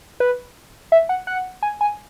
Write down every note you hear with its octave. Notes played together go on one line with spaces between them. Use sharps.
B4
E5
F#5
F#5
G#5
G#5